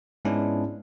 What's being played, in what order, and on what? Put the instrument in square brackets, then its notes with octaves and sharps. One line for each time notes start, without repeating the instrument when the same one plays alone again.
[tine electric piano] G#2 G#3 B3 C#4 D4 E4